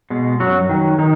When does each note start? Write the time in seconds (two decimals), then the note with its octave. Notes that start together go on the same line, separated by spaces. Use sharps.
0.10 B2 G#3
0.40 F#2 F#3 F#4
0.69 D#3 F#3
0.98 D#3 D#4